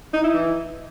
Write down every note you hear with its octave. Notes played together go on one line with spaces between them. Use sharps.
D#4
E4
E3